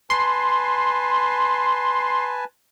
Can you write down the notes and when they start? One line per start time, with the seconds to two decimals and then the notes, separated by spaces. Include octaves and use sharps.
0.10 B4 G#5 A5 C6